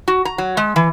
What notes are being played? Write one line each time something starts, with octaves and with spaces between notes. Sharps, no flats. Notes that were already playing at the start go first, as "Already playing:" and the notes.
F#4
A#5
F#3
G#3
E3